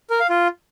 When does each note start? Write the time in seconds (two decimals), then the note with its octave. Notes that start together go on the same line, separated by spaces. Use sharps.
0.10 A#4
0.20 F5
0.30 F4